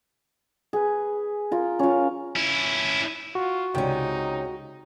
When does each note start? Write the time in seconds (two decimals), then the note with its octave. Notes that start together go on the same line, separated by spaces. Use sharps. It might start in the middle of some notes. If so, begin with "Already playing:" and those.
0.73 G#4 B4
1.51 F4 A#4
1.79 C#4 F4
2.36 C#4 E4
3.35 F4 F#4
3.75 C#2 C3 C#4 D#4 G5